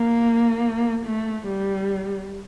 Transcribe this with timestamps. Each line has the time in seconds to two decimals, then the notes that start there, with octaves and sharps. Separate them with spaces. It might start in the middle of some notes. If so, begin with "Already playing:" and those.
Already playing: A#3
1.06 A3
1.47 G3